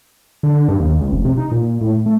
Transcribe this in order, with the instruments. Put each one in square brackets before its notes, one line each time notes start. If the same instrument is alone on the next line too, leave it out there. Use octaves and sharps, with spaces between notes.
[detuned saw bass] D3
G2
D#2
C#2
F1
C3
D#4
A#2
A2
A3